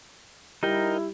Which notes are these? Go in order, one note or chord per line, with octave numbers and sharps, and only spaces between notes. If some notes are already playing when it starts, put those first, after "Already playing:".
G3 D#4 E4 A#4 G5